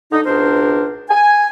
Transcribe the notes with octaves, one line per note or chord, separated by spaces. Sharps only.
D3 D#4
C#2 B2 D4 A#4 C5
G#5